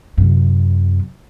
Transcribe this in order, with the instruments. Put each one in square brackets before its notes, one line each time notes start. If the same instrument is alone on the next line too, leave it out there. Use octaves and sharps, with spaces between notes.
[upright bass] F#2 C3